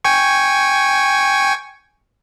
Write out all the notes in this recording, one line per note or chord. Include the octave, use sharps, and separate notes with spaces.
G5 G#5 C#6